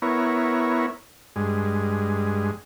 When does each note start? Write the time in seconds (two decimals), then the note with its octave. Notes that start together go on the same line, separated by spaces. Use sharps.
0.02 B3 E4 A#4 C#5
1.36 G2 G#3